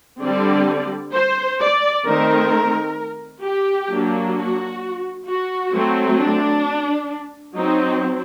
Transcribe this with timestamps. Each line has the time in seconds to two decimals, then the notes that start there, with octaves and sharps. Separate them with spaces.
0.22 D3 G3 C4 D5
1.14 C5
1.60 D5
2.05 D#3 A3 C4 A#4
3.43 G4
3.89 F#3 A#3 D4
4.35 F#4
5.27 F#4
5.72 F#3 A3 C4
6.18 D4
7.55 F#3 C4 D#4